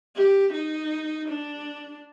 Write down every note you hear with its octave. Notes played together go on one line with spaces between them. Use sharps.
G4
D#4
D4